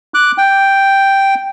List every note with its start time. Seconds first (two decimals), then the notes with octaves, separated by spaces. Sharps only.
0.14 D6 F#6
0.38 G5